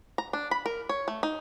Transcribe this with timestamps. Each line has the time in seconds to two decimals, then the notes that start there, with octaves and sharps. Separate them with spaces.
0.18 A#5
0.33 D4
0.51 B5
0.66 A#4
0.89 C#5
1.08 A3
1.23 D#4